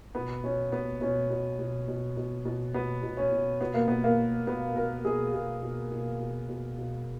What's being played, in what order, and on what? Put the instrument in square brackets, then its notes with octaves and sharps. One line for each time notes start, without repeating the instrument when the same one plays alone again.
[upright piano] B2 B3
B2 C#4
B2 B3
B2 C#4
B2
B2
B2
B2
B2
B2 B3
B2
C#4
B2
B2 B3
A#3
B2 B3
A#3
B2
B2 B3
B2 A#4
B2 G#4
B2 G#4
B2
B2
B2
B2
B2